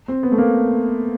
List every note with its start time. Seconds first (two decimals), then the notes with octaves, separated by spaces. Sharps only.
0.08 C4
0.23 B3
0.32 A3
0.38 A#3